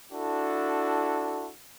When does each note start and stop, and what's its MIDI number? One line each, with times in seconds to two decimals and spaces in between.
0.12 1.51 62
0.12 1.51 64
0.12 1.51 66
0.12 1.51 69